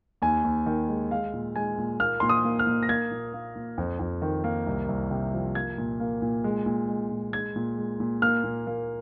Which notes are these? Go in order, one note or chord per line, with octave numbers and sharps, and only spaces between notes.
D#2 G#5
D#2
D#3
G#3
G#3 F5
A#2
G#3 G#5
A#2
A#3 F6
A#2 C6
D#6
A#3
F6
A#2
A#6
A#3 G#6
A#2
A#3
A#2
F2
F2
D#3
A#3
C2
C2
C3
F3
A#3 G#6
A#2
A#3
A#2
G#3
A#2
G#3
A#2
G#3 G#6
A#2
G#3
A#2
A#3 F6
A#2
A#3